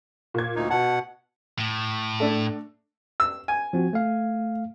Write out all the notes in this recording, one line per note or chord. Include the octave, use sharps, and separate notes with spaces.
A#2 G#6
D2 D#4
B2 F#5 A5
A2
A3 D4 A4
E6
G#5
F3 C4 F#4
A3 F5